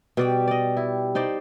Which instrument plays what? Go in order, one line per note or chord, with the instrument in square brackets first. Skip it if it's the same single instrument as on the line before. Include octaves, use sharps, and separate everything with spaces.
[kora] B2 D5 [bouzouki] G3 G4
[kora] D5 D#5
E4
D#4 C5 D5